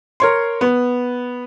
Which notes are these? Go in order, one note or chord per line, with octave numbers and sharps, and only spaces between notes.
A#4 C#5 C6
B3